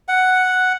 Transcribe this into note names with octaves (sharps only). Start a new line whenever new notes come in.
F#5